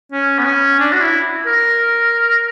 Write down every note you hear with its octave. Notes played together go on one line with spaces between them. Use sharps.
C#4
B3
C#4
D4
F#4
E4
A#4